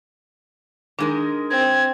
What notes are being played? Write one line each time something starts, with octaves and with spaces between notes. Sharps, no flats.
D#3 G#3 D4 A#4
C4 G#6